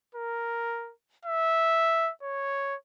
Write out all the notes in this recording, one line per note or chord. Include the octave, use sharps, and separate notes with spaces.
A#4
E5
C#5